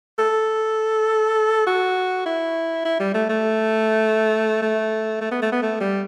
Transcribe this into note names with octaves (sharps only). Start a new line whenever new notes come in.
A4
F#4
E4
E4
G3
A3
A3
A3
A3
B3
A3
B3
A3
G3